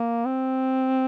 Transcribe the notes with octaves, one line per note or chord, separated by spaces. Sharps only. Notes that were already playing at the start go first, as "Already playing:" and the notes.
Already playing: A#3
C4